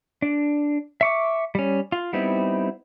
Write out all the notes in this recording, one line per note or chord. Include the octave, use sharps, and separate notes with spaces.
D4
E5 C#6 D6
G3 C#4
F4
G3 B3 C4 D#4 E4